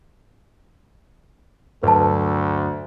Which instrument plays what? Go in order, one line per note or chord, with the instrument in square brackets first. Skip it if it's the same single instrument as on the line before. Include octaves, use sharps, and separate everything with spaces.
[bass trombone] D2 [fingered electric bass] G2 F#3 [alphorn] A4 [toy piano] B4 A5